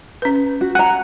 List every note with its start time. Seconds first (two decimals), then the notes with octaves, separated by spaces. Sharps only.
0.22 C#4 B4
0.61 F#4
0.75 F#5 G#5 A#5